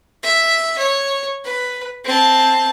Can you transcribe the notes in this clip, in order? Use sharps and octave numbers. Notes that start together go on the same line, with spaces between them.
E5
C#5
B4
C4 A5